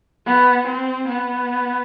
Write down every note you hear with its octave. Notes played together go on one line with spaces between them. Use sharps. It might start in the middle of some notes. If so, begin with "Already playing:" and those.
B3
C4
B3